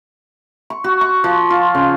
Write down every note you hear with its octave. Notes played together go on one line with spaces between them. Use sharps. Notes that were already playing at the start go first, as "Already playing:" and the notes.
C#6
F#4
C#6
F3
F4
C#3